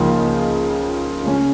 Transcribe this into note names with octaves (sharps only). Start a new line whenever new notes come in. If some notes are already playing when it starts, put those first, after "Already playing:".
Already playing: C#2 C#3 F3 A#3 D#4
C#3 G#3 C#4